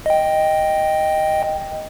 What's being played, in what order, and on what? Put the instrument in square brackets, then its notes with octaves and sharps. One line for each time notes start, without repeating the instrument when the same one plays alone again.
[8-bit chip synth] D#5 G5